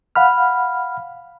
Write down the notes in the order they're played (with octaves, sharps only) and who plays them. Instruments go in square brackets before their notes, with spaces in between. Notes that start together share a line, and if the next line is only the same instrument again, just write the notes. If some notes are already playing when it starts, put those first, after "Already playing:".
[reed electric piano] F5 F#5 B5 F6